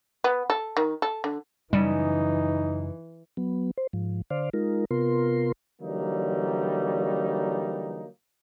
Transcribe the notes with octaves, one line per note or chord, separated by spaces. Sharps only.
B3
A4
D#3
A4
D3
F#2 C#3 E3 G3 D#4
F#3 B3
C5
G#2 F3
D3 C5 D5 F5
G#3 D#4 F4 A#4
C3 B3 F4 A#4 C6
D3 E3 F#3 G3 A#3 D#4